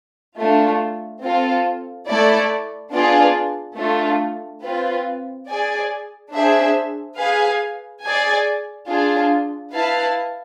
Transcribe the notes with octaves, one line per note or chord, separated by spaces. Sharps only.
A3 D4 F4
C4 F4 A4
A3 E4 A4 D5
B3 D4 F4 G#4 D5
A3 D4 F4
C4 F4 B4
G#4 D5 G#5
D4 G#4 C5 E5
G#4 B4 F5 G#5
G#4 D5 G#5
D4 F4 G#4
E4 B4 F5 A5